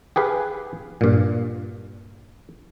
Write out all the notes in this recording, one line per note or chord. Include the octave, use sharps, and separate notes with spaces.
G4 G#4 B4 F5
G2 A#2